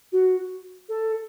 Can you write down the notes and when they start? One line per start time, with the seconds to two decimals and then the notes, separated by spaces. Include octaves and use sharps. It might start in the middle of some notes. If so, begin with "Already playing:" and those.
0.12 F#4
0.89 A4